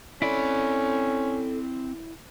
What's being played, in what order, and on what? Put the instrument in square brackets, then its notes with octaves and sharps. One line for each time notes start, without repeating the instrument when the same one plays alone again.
[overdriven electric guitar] C4 B5 [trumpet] C#4 [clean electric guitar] E4 D5 [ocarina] A4